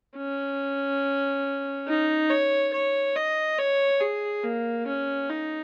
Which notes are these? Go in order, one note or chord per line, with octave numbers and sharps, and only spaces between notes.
C#4
D#4
C#5
C#5
D#5
C#5
G#4
A#3
C#4
D#4